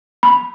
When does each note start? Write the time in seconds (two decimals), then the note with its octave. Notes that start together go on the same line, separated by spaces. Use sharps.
0.23 B5